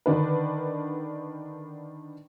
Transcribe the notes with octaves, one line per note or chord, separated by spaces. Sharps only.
D3 D#3 D4 B4